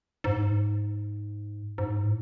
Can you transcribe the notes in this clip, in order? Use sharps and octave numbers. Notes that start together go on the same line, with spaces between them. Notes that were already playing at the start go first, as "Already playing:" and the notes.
G#2
G#2
A2